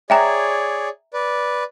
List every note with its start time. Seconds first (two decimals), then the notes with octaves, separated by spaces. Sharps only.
0.10 G#4 C#5 D5 E5 G5 A#5
1.13 B4 D5